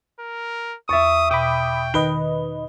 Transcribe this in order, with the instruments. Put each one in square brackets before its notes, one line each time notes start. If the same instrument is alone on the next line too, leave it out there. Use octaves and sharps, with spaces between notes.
[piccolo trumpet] A#4
[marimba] E2 A6 [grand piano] E5 C#6 [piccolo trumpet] D#6
[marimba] B2 [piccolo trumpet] G5 [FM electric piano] B5 D6 D#6
[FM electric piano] D#3 B4 D#5 [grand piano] G7